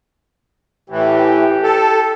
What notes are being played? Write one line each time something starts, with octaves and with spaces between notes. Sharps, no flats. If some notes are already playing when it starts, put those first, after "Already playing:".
A2 E3 G4
A4